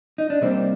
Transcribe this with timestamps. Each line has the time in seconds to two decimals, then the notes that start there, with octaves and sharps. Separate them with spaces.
0.18 D#4
0.30 D4
0.41 C3 G3 A#3 C4